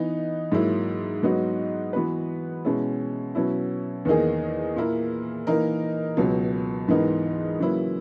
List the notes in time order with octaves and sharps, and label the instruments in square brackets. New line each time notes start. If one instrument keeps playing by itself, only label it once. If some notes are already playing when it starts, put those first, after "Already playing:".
Already playing: [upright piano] E3 B3 D#4
G#2 F#3 A#3 E4
G#2 F#3 B3 D#4 F#4
E3 B3 F#4 B4
B2 G#3 C#4 E4
B2 F#3 C#4 E4
E2 D#3 A#3 D#4 G#4
A#2 A#3 E4 A#4
E3 A#3 D#4 A#4
C#2 B2 F#3
G#2 E3 B3 D#4 A#4
C#3 F#3 A#3 E4 B4